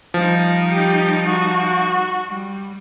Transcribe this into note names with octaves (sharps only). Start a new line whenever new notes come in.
F3 G3 D#4
G4
F#4
G3